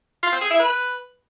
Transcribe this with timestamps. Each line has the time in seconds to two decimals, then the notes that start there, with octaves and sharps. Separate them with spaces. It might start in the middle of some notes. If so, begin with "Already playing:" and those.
0.23 F4
0.32 C4
0.41 G#4
0.51 E4
0.60 B4